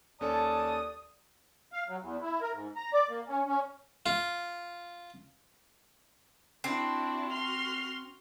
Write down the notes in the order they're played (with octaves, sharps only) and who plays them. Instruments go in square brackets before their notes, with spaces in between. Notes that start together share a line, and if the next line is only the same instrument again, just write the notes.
[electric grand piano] D#2 C#4 A4 [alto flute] D5 [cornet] A5 [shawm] D#6
[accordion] F5
F#3
E2
E4
A#4
G#2
A#5
D5
A#3
C#4
C#4
[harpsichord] F4
[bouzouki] C4 [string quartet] D4 E4 F#4
[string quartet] F#4 C6 F6